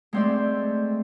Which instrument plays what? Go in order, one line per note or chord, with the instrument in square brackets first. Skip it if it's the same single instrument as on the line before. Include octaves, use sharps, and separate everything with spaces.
[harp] G#3 A3 C4 C5 D5 E5